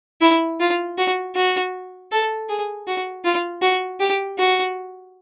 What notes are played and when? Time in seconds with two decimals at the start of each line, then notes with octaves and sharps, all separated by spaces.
0.21 E4
0.60 F4
0.98 F#4
1.35 F#4
2.12 A4
2.49 G#4
2.87 F#4
3.25 F4
3.62 F#4
4.00 G4
4.38 F#4